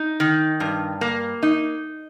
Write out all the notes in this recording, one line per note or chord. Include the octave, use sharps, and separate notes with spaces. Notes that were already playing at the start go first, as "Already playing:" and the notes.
Already playing: D#4
D#3
G2
A#3
D#4